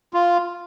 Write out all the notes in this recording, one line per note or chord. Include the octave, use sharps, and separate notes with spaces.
F4